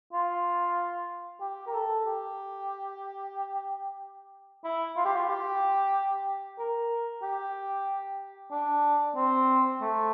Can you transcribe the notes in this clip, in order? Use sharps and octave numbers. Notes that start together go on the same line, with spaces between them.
F4
G4
A#4
A4
G4
E4
F4
G4
F4
G4
A#4
G4
D4
C4
A3